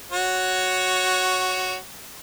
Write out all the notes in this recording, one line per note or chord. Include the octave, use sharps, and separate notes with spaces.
F#4 C#5